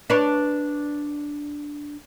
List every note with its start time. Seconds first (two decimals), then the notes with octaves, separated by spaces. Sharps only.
0.10 D4 B4 C#5